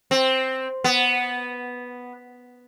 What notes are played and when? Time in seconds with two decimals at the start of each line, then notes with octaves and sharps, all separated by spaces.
0.11 C4
0.84 B3